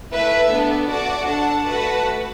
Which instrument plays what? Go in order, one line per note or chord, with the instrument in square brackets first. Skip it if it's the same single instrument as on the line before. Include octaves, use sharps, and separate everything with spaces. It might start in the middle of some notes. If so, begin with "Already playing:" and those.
[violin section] A3 E4 B4 E5
B3 D4 A4
F#4 D5 F#5 A5
D4 A4 F#5 A5
A3 F#4 B4 F#5 A5